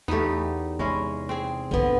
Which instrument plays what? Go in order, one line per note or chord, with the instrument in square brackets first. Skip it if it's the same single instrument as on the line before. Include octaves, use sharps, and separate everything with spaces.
[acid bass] E2 [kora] A3 B3 [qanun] D#4 G4
[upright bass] C3 [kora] G#3 C#4 E4
[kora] C4 G#4
[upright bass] G1 C2 [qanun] D3 B3